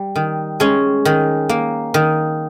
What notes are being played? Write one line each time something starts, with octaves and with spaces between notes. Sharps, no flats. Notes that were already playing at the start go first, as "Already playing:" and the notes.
Already playing: G3
D#3
G#3 C#4
D#3
A#3
D#3